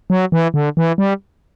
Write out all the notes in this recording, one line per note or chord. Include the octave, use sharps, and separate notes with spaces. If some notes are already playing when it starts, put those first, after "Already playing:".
F#3
E3
D3
E3
G3